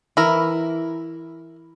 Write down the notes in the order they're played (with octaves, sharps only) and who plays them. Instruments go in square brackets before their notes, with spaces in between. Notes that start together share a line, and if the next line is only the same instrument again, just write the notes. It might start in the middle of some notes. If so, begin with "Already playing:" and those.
[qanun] E3 [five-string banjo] E4 A#4